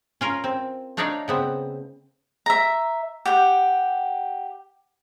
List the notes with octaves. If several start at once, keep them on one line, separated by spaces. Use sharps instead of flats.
C#4 F4 A#4
C4
A3 D4 D#4 C#5 D5 F5
C#3 B3 C4
E5 A#5
G4 F#5 G5